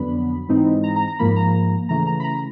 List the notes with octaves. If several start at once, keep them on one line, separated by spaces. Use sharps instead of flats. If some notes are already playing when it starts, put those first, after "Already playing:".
Already playing: F2 D3 F#3 B3 D4 B5
G#2 E3 G#3 C4 D#4
A#5
A#5
A#5
G#2 F3 A#3 B5
A#5
C#3 E3 A3 A#5
A#5
B5
A#5